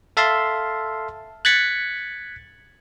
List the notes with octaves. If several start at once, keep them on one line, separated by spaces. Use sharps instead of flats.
A4 E5 F5 A5 C6
F#6 G#6 A6 B6 C#7